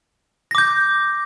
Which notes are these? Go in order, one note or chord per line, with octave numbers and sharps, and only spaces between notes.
D6 G6 A#6